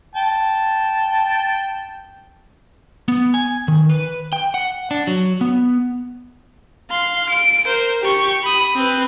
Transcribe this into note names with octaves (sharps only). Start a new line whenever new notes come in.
G5 A5
B3
G#5
D#3
B4
G5
F#5
D4
F#3
B3
F5 C6
D7
A#4 C5
G4 C#6
B5 D#6
C4 B4